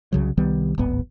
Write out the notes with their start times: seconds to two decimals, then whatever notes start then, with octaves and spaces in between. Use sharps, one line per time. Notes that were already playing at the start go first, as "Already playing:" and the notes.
0.13 C2 C#3 F#3
0.37 C2 D#3 G3 B3
0.78 D1 G#1 B3